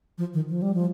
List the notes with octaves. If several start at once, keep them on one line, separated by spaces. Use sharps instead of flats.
F3
D#3
F3
G3
F3